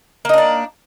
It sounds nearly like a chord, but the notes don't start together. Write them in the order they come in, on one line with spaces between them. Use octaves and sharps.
A#3 D#4 D4 D5